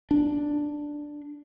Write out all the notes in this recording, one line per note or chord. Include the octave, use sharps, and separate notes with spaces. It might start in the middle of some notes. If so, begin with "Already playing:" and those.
D4